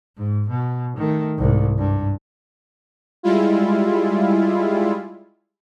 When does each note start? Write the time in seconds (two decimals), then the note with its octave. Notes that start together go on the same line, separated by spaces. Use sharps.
0.16 G#2
0.49 B2
0.97 D#3 A3
1.38 C2 G#2
1.78 G2
3.23 G3 G#3 E4 F4